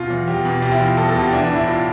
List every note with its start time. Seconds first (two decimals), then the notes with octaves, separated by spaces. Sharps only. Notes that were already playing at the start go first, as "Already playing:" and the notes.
Already playing: B2 F4
0.10 E2
0.28 E2 G4
0.45 B2
0.62 B2 G4
0.72 E4
0.80 E2 F4
0.97 E2 A4
1.09 A4
1.15 B2
1.21 G4
1.32 E3 D4
1.44 D4
1.50 A2
1.56 E4
1.67 A2 F4